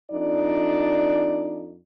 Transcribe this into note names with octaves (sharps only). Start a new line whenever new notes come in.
F2 D4 D#4 D5